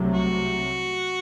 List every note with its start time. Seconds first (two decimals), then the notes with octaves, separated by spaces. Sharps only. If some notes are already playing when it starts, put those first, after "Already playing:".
Already playing: C2 C3 F#3 A3
0.13 F#4